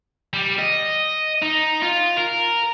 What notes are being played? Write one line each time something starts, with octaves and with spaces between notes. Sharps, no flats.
G3
D#5
D#4
F4
A#4